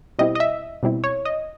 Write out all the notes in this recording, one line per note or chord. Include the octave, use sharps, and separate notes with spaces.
B2 G3 C4 E4 D#5
D#5
E5
B2 G3 C4 E4
C#5
D#5